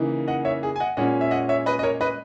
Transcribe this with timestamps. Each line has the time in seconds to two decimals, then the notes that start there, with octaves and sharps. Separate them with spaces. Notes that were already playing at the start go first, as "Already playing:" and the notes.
Already playing: C#3 E3 A#3 D#4
0.28 D#5 F#5
0.45 C#5 E5
0.63 G#4
0.76 G#5
0.80 D#5 F#5
0.97 A#2 G#3 C#4 D#5 F#5
1.21 E5
1.31 D#5 F#5
1.49 C#5 E5
1.66 B4 D#5
1.79 D#5
1.83 A#4 C#5
2.01 B4 D#5